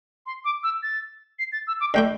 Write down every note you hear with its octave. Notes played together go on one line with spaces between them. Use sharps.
C6
D6
E6
A6
C7
A6
E6
D6
D3 A3 E4 G5